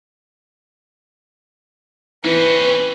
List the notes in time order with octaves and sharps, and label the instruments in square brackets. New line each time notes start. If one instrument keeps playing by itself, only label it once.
[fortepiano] E3 [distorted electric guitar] C4 C#4 [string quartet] B4